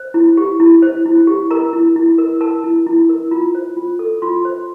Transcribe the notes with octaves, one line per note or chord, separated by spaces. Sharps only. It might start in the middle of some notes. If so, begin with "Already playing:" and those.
Already playing: C5
E4
G4
E4
C5
E4
G4
A#4 A#5
E4
E4
A#4
A#4 A5
E4
E4
A#4
F4 A#5
C5
F4
A4
F4 C6
C5